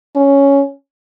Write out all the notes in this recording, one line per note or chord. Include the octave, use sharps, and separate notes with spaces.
C#4